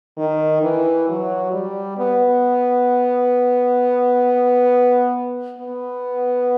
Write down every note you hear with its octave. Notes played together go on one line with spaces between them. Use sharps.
D#3
E3
F#3
G3
B3
B3